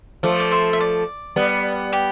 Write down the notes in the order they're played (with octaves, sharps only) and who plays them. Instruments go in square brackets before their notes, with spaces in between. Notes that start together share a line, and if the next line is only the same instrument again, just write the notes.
[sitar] F3 A3 [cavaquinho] D5
[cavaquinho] D5
C5 E5
E5
D5
[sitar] G3 B3
[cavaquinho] G4